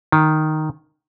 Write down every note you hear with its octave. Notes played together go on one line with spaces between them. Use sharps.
D#3